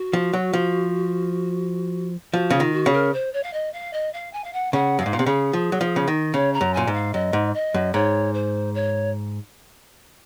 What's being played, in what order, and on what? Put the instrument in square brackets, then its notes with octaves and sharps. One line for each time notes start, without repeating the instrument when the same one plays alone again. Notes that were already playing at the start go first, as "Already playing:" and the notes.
Already playing: [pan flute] F#4
[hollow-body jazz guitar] F3
F#3
F3
[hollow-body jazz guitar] F3 [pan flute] F#4
[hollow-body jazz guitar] C#3 [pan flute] F4
[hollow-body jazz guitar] D#3
[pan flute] F#4
[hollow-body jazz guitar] C#3
[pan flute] A#4
C5
C#5
F5
D#5
F5
D#5
F5
G#5
F5
F#5
[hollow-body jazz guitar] C#3 [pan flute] F#5
[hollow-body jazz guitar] F#2 [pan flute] F5
[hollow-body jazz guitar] G#2
A#2
C3
[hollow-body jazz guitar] C#3 [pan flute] G#4
[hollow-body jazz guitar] F3
F#3
F3
C#3
D#3
[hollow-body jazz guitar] C#3 [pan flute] C#5
[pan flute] A#5
[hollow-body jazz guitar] F#2
[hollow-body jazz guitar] A#2 [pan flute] G#5
[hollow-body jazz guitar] G#2
[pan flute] F5
[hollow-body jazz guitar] F#2 [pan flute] D#5
[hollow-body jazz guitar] G#2
[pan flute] D#5
[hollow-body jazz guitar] F#2
[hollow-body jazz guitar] G#2 [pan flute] C#5
[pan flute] C5
C#5